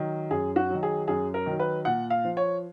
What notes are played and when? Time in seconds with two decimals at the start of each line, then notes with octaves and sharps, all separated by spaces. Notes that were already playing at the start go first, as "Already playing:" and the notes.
Already playing: D#3 F#3
0.31 F#2 G#4
0.56 F#4
0.70 D#3 F#3
0.83 G#4
1.08 F#2 G#4
1.34 A#4
1.46 D#3 F#3
1.60 B4
1.85 A#2 F#5
2.10 F5
2.24 F3
2.37 C#5